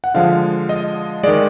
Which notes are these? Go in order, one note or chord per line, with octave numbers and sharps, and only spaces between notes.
F#5
D3 F3 G#3 F5
D#5
D#3 G#3 D5